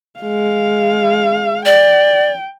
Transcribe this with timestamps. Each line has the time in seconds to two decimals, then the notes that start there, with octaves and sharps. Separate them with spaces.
0.20 G#3 F5
1.65 D5 G5